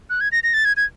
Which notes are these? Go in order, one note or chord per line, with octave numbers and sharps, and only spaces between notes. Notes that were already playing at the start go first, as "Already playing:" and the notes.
F#6
G#6
A#6
A#6
A6
G#6
G#6